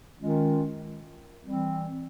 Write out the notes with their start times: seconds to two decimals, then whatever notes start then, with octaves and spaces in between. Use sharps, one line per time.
0.19 D#3 G#3 C#4 F4
1.45 E3 G3 C4